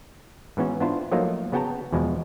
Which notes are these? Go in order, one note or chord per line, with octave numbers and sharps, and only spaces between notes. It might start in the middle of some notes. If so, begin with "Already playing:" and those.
G#2 E3 B3 C#4 F#4
B3 D4 E4 F4 C5
F3 F#3 A3 A#3 D#4 F4
C#3 B3 F#4 G5 A5 A#5
E2 B2 F3 G#3